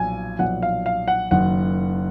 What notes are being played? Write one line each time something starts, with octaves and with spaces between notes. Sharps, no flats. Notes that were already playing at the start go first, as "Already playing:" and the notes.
Already playing: B1 A#2 F3 G#5
B1 A#2 F3 F#5
F5
F5
F#5
F#1 F#2 D#3 F#5